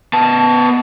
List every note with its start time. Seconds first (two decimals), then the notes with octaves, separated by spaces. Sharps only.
0.13 B3 A5